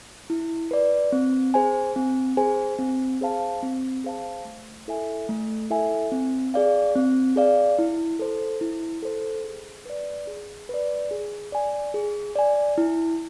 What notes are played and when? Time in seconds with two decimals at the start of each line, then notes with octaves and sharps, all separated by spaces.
0.30 E4
0.71 B4 D5
1.12 C4
1.54 G#4 C5 G#5
1.96 C4
2.37 G#4 C5 G#5
2.79 C4
3.21 G#4 C5 F5 A5
3.63 C4
4.04 G#4 C5 F5 A5
4.45 A3
4.88 E4 A4 E5 G#5
5.29 A3
5.70 E4 A4 E5 G#5
6.12 C4
6.54 G#4 D5 F5
6.96 C4
7.36 G#4 D5 F5
7.78 E4
8.19 A4 C5
8.61 E4
9.03 A4 C5
9.44 G#4
9.85 B4 D5
10.27 G#4
10.69 B4 D5
11.11 G#4
11.52 D5 G#5
11.94 G#4
12.35 D5 G#5
12.78 E4